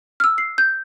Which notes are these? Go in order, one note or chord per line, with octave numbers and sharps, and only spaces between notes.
E6 F6
C7
G6